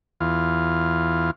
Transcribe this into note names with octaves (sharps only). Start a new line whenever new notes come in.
E2 F4